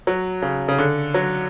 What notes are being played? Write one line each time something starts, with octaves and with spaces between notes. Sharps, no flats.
F#3
C#3
C#3
D3
F#3